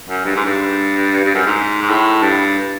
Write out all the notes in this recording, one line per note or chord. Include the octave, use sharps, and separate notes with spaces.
F#2
G2
G#2
G2
G2
F#2
G#2
G#2
A2
G2